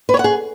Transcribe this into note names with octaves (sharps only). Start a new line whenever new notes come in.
B4
C#5
F#5
G#4